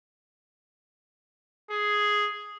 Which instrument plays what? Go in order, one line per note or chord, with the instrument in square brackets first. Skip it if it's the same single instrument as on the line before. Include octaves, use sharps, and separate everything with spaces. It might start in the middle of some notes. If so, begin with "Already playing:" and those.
[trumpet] G#4